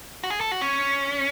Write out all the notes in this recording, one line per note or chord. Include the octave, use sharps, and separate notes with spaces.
F#4
G#4
A4
F#4
C#4